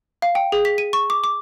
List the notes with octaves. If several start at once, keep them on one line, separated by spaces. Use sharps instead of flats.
F5
G5
G#4
B6
D#7
C#6
D6
D6